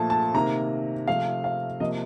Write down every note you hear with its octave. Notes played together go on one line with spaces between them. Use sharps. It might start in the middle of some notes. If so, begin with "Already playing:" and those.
Already playing: A#2 F3 A3 A5
A5
C3 D#3 A#3 A#5
C3 F3 A3 F5
F5
C3 F3 A#3 D#5